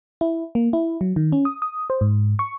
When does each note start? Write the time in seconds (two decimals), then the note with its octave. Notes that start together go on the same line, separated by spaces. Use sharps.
0.21 E4
0.55 A#3
0.73 E4
1.01 F#3
1.16 D#3
1.32 C#4
1.45 D#6
1.62 D#6
1.90 C5
2.01 G#2
2.39 C#6